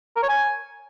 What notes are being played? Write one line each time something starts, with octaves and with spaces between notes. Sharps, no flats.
A#4
C#5
G#5